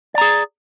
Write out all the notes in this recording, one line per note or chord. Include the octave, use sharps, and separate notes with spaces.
G#4 D5 A#5